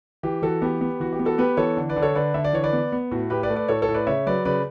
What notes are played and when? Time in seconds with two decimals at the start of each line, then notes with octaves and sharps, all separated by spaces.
0.23 E3 G4
0.42 E3 F#4 A4
0.62 B3 G4
0.81 B3
1.00 E3 F#4
1.12 G4
1.19 B3
1.25 F#4 A4
1.38 B3 G4 B4
1.57 E3 A4 C#5
1.77 D3
1.89 B4 D5
1.96 D3
2.02 A4 C#5
2.15 D3 B4 D5
2.34 D3 E5
2.44 D5
2.53 E3 C#5
2.63 B4 D5
2.73 B3
2.92 B3
3.11 A2 F#4
3.30 A2 G4 B4
3.43 B4 D5
3.50 A3
3.56 B4 D5
3.68 A2 A4 C#5
3.82 A4 C#5
3.88 A2
3.94 B4 D5
4.07 C#3 C#5 E5
4.26 F#3 B4 D5
4.45 C#3 B4 D5